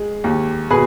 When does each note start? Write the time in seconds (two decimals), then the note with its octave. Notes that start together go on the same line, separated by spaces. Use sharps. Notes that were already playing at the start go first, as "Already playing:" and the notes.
Already playing: G#3
0.24 D#2
0.70 B2 G#4 B4